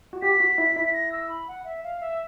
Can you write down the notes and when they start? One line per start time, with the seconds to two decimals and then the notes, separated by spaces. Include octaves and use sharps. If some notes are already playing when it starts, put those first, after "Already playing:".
0.13 F#4
0.22 G4 B6
0.40 F#4
0.58 E4
0.76 E4
0.85 B6
0.93 A#6
1.12 E6
1.29 B5
1.48 F#5
1.65 E5
1.84 F5
2.01 E5